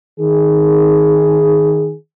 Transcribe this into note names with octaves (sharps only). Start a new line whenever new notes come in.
D#3 G#4